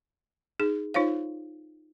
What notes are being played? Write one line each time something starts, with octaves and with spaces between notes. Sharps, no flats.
D#4 G#4
D#4 F4 C5 C#5 F5